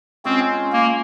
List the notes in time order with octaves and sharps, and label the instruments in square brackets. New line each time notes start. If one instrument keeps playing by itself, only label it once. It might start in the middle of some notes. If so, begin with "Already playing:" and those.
[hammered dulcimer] G#3 C#4 F4 G#4 [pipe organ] C4
[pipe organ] A#3